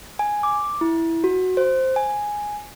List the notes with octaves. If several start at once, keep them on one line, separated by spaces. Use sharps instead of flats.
G#5
D6
E4
F#4
C5
G#5